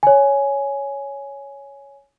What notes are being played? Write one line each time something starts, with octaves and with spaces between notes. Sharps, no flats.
C#5 G#5